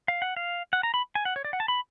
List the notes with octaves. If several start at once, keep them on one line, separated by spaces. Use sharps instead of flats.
F5
F#5
F5
F#5
A#5
B5
G#5
F#5
C#5
D5
F#5
A5
B5